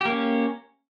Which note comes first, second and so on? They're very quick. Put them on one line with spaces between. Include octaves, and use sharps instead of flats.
G4 A#3 C#4